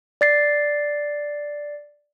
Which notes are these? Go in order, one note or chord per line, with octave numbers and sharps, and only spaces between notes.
D5 A6 C7